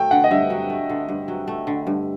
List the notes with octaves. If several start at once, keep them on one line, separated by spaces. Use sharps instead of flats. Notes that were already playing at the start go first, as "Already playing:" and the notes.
Already playing: F#3 A3 G5
D3 F#5
D#5
G2 E5
F#3
A3
D3
G2
F#3
A3
D3
G2